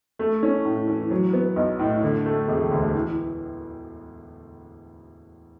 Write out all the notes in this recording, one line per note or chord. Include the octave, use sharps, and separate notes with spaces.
A3
C#4
A2
E3
F#3
B3
B1
A2
D3
A3
E1
D2
E3